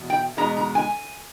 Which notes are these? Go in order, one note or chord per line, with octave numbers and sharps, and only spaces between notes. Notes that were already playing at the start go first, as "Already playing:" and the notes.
Already playing: E2 B2
G5
E2 B2 G#3 A#5
A#5
G#5